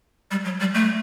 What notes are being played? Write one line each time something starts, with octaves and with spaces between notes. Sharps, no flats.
G3
F#3
G3
A3